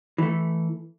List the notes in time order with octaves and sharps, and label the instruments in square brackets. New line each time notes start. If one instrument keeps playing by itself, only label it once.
[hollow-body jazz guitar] E3 A3